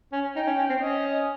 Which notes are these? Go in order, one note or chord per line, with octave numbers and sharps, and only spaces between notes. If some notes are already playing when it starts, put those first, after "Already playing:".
C#4
D#4 G5
C#4
C#4
C4
C#4 D#5